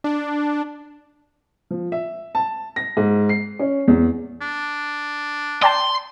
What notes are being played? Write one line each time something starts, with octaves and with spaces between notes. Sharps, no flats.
D4
F3
E5
A5
A#6
G#2
C7
C#4
E2
D4
D5 G5 A5 C6